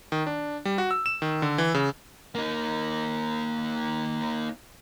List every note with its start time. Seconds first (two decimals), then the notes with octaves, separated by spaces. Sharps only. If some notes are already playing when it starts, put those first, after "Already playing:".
0.12 D#3
0.27 D4
0.65 G3
0.78 F#4
0.91 E6
1.06 E7
1.22 D#3
1.42 D3
1.58 E3
1.74 C#3
2.35 A#3 D#4